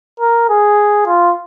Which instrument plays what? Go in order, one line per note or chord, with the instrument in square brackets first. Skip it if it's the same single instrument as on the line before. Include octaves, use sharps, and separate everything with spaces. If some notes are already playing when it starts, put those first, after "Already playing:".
[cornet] A#4
G#4
F4